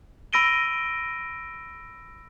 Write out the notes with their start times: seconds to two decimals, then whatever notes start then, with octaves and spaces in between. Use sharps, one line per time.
0.33 B5 E6 A#6 D7 D#7 G7